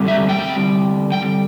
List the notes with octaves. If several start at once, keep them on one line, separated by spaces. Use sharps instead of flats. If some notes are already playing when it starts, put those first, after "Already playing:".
Already playing: D3 G3 C4
E5
G5
G5